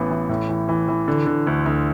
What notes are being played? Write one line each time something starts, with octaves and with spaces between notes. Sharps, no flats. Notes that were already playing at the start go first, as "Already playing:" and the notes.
Already playing: A1 E3 A3 B3
E3
A2
E3
E3
E3
D3
D3
D2
D2